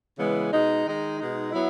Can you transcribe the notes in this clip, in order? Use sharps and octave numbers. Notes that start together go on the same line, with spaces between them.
C#3 E3 G#3 B3
B2 G#3 D#4
D#3 G#3 D#4
B2 G#3 D#4
F#3 B3 E4